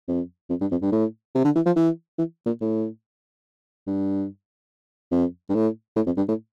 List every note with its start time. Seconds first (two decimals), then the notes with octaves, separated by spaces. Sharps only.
0.08 F2
0.50 F2
0.61 G2
0.71 F2
0.82 G2
0.92 A2
1.35 C3
1.44 D3
1.56 E3
1.66 F3
1.76 E3
2.18 E3
2.46 A#2
2.61 A2
3.87 G2
5.12 F2
5.50 G2
5.55 A2
5.96 A2
6.06 F2
6.17 G2
6.28 A2